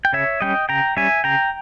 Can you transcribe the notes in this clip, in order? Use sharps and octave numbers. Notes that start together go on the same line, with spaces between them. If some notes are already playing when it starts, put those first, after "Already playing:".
G5
C#3 C#5 E5
G3 C#4 D#5 G5
C#3 G5 A#5
G3 C#4 E5 G#5
C#3 G5 A#5